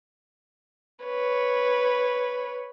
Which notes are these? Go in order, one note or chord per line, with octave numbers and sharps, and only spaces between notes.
B4 C#5